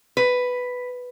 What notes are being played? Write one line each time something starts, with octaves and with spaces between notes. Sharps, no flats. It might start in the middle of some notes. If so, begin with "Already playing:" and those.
B4